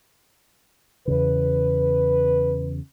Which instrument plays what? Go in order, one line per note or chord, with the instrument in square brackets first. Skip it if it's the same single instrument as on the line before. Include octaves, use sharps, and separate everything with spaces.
[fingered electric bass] E2 C#3 [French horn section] B4